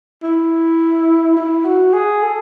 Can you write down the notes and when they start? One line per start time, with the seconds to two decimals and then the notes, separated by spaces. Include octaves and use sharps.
0.23 E4
1.37 E4
1.65 F#4
1.93 G#4
2.23 A4